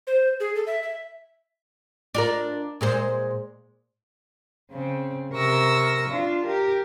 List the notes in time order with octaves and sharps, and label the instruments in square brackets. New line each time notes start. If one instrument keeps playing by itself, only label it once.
[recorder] C5
G#4
A4
E5
E5
[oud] D4 F4 A#4
A#2 G#3 C5
[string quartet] C#3 C4
C3 A#4 C#6 E6 A#6
D4 F4
G4 A#4